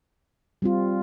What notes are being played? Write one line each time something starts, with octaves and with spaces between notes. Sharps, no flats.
G3 C4 F4